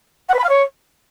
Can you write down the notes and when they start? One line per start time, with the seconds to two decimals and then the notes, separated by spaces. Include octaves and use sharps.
0.28 F#5
0.33 B4
0.39 B5
0.44 F5
0.49 C#5